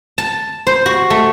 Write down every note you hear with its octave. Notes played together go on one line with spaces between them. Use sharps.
A5
C5
F#4
A3